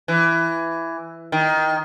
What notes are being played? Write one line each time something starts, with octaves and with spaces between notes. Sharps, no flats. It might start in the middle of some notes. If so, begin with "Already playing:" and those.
E3
D#3